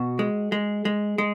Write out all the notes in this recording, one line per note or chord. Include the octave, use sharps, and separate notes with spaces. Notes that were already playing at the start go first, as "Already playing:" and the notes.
Already playing: B2 F#4
G#3
G#3
G#3
G#3